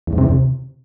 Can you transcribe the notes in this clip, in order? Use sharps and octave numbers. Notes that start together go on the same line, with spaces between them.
E2
G#2
C3
E2
C3